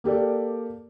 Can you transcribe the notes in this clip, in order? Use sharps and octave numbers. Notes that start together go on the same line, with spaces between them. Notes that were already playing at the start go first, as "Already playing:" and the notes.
A#3 G4 A4 D5